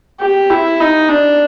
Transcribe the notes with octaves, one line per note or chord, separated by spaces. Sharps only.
G4
E4
D#4
D4